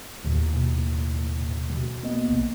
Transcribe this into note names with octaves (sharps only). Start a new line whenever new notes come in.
D#2 A2
B2
B2
A#3 B3 D#5
A#1